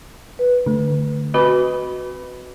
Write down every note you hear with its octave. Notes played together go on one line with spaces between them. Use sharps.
B4
D3 A3
C4 F#4 B4 D#5 B5